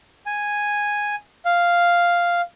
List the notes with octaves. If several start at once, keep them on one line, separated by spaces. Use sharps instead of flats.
G#5
F5